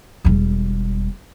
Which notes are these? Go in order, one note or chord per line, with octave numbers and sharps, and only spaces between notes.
E1 G3